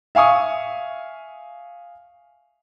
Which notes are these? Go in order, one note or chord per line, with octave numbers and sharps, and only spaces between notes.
E5 F5 G#5 C#6 D#6